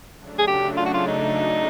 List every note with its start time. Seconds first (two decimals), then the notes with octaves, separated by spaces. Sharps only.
0.17 C#3 F#3 A3 D4
0.39 G#4
0.47 G4
0.77 F4
0.86 F#4
0.94 F4
1.08 D#4